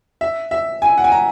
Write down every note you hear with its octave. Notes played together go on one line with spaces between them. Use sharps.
E5
E5
G#5
F#5
G#5
A#5